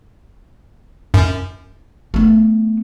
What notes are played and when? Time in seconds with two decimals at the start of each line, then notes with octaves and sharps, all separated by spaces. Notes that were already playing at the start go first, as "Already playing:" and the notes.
1.14 F#2
2.14 A3 B3